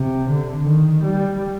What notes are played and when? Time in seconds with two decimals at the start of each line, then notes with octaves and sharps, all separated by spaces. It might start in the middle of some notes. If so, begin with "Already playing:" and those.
Already playing: C3
0.30 D3
0.67 D#3
1.03 G3